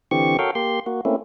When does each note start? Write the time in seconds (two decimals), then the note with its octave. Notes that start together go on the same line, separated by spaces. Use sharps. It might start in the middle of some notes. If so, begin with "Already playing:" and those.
0.11 D3 E3 C4 G4 C#6
0.39 F#4 A4 A#4 C#5 F5 G5
0.55 A#3 G4 C6
0.86 A#3 F#4
1.05 A3 A#3 C4 C#4 E4